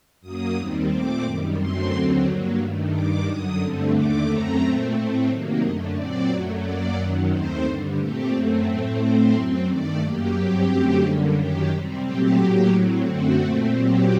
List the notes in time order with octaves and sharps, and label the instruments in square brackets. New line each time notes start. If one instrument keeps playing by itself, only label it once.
[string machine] F#2 F#3 A#3 D#6
D#2 D#3 G3 C4
A#2 A3 C4 D6
F#2 D#3 G3
F#2 D3 F#3 A3 C4 C6
D#2 D3 F#3 C4
G2 F#3 A#3
G2 D#3 A3
G2 D#3 G3 D6
F#2 D3 F#3 D#6
G2 D3 A3 C4
D#2 D3 A3 D6
F#2 F#3 A3 C4 A#5
A#2 A3 C4
A2 A3 C4
C3 D#3 F#3 A#3
F#2 D3 A3 D#5
A#2 F#3 C4 D5
F#2 F#3 A3
F#2 F#3 A#3 D5
F#2 D#3 F#3
D#2 D#3 A3 C4 C5
G2 D3 G3
A#2 A3 C4 G4
F#2 F#3 A3 C4
A2 A3 C4
A2 A3 C4 C5
F#2 F#3 C4
G2 D#3 A3 D5
F#2 F#3 A#3 G4
G2 F#3 C4 G4
F#2 D3 F#3 A3 C4 G4
F#2 D3 G3 A#3
F#2 D#3 F#3 G4
C3 G3 C4
A#2 F#3 A3 C4 G4
A2 F#3 A#3 G4
A2 F#3 C4
F#2 D3 A3 C4 F#4
A#2 A3 C4 F#4
A#2 F#3 C4 G4